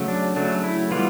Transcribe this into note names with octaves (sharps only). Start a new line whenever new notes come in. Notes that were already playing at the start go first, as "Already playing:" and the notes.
Already playing: C#3 F#3 A3
D4
C#3 F#3 A3 D4
E4
E3 G3 B3 F4